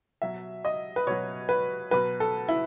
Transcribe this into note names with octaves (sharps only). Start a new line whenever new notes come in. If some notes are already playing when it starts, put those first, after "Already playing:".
B2 F#3 E5
D#5
B4
B2 F#3 C#5
B4
B2 F#3 B4
A4
E4